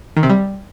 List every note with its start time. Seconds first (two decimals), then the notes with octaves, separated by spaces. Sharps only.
0.17 D#3
0.23 C3
0.30 G3